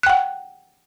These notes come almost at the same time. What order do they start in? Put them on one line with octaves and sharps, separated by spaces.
F#6 G5 F#5